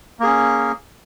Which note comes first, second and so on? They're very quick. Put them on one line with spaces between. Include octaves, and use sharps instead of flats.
A#3 G#4 C#4